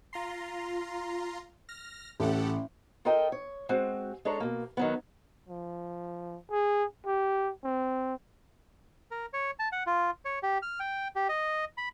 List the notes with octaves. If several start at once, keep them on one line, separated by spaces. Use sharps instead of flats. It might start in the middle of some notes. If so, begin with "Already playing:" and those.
F4 A#5 C6
F6 A#6
A1 G4 A4 F#5
F4 A4 A#4 D#5 G5
C#5
G#3 C4 F#4
G#3 D4 A4 C#5 A#5
B2 A#3
D#3 F#3 B3
F3
G#4
G4
C4
A#4
C#5
A5
F#5
F4
C#5
G4
F6
G5
G4
D#5
B5